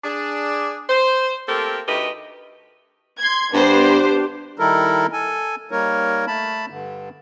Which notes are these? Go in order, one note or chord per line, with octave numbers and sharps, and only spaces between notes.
D4 G#4
C5
A3 A#3 C4 G4 A4 A#4
D2 A3 D#4 G4 B4 D#5
C6 G#6
G2 B3 D4 G4 C5
D#3 G3 D#4 E4 A4 A#4
A4 G#5
G3 A#3 D#4 A#4 C#5
A3 A5 B5
G2 D3